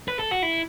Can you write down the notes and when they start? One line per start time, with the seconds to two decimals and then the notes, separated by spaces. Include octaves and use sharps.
0.08 B4
0.19 A4
0.31 F#4
0.43 E4